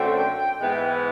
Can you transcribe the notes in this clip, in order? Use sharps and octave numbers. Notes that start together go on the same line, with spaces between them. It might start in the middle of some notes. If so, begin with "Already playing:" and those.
Already playing: F#2 D3 F#3 A3 C4 G5
G#2 E3 G#3 B3 E4